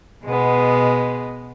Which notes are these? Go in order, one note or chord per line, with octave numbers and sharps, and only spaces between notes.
B2 G#3 B3